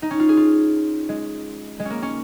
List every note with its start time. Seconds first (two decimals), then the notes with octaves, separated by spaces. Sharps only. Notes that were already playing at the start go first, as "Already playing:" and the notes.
0.02 D#4
0.11 C#4
0.20 F4
0.29 G#4
0.37 F4
1.09 G#3
1.80 G#3
1.85 A#3 C#4
2.02 C#4